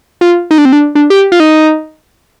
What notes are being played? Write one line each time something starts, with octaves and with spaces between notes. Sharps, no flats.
F4
D#4
D4
C4
D4
D4
G4
F4
D#4